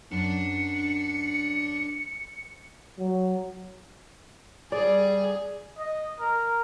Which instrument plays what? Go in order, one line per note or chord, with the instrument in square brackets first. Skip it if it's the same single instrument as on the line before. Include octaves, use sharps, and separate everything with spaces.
[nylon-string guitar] F#2 [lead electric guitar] D4 A5 [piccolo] C#7
[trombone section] F#3
[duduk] G3 [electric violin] G#4 [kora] D5
[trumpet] D#5
A#4